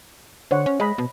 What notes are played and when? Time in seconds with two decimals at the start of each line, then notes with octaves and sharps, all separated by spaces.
0.51 D3 C5 C#5 F#5
0.66 C#4
0.80 G#3 D#5 B5
0.98 B2